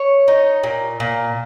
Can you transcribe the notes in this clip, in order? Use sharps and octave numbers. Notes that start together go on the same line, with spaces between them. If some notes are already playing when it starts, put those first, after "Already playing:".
Already playing: C#5
D#4
A#2
A#2